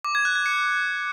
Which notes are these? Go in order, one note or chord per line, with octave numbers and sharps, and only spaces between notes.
D6
G#6
F#6
G#6
C#7